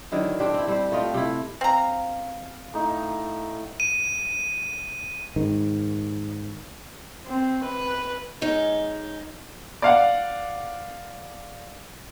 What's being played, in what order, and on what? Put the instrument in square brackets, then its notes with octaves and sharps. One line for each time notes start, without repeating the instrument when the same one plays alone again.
[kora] D3 D#3 F#3 E4
C4 D4 G4
C4 E4
G3 C4 C5
A3 F4 D#5 G5
C3 A3 E4
[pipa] C4 A#5 [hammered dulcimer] F5
[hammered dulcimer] A2 D#4
[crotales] D#7
[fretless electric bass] G#2 D#3
[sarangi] C4
B4
[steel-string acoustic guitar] G#3 C#4 D#4
[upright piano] D5 F5 F#5